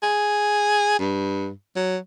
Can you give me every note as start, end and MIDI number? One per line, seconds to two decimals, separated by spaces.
0.02 0.97 68
0.99 1.50 43
1.76 1.97 54